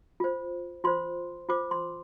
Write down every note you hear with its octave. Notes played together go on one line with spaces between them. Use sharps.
F4 C5
F4 C5 C6
F4 C5 D6
C6